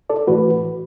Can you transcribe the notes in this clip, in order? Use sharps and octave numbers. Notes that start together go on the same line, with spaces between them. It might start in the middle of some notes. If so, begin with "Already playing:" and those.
A4 D5
A2 E3 A3 F#4 B4